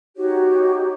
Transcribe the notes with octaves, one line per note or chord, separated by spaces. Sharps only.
D#4 F#4 G4 C#5